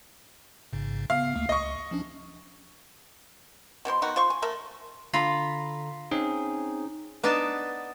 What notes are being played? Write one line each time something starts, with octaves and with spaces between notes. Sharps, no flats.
A1 G#2 C#3
C#3 B3 F5
D2 A3 A#3
C#2 D#5 C#6
F3 C#4 D4
B2 E3 C5 C6
D#3 B3 D#4 F#4
F4 C5 C6 C#6
G#5
A3 A#4 E5
D3 F4 A4 A#5 B5
C4 C#4 D#4 G#4
B3 D4 D#4 D5 A5